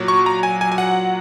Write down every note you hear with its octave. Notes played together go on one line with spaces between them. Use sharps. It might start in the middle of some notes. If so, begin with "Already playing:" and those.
Already playing: A#2 F#3
C#6
A#5
G#5
G#5
G#5
F#5